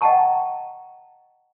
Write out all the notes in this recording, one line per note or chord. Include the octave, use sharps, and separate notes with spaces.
D#5 F#5 G5 A5 A#5 C#6